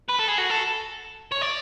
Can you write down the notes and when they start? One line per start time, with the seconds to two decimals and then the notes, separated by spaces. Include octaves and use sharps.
0.09 B4
0.19 A4
0.29 G#4
0.38 F#4
0.50 A4
1.32 C#5
1.42 D5